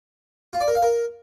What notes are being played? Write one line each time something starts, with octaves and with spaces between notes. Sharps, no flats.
F4
D5
A#4
F5
A#4